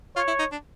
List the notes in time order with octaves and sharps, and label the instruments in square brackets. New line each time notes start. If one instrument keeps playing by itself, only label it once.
[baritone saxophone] F4 [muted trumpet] C#5
[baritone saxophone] E4
D#4
D4